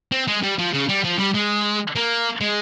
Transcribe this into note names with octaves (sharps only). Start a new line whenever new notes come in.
C4
G#3
G3
F3
C#3
G3
F3
G3
G#3
A#3
G#3